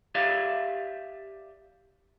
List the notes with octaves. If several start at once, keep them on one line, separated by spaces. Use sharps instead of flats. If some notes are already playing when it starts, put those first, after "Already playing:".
G4 D5 E5 F5